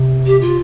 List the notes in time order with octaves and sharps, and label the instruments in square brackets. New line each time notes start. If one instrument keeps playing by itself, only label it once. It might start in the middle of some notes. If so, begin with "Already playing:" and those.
Already playing: [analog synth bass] C3
[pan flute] G4
F4